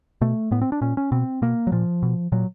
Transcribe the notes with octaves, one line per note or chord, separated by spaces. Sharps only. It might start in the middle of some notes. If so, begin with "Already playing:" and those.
B2 A3
A2 B3
C4
D4
A#2 C#4
C#4
B2 C4
B2 A#3
F#3
A#2 F3
B2
A#2 F#3